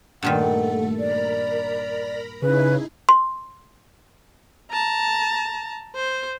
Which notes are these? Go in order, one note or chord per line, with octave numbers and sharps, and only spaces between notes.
G2 A#2 D#3 A3 A4 F#5
A#4 D5 A#5 B5
C#3 D#4 E4 G#4 B4
C6
A5 A#5
C5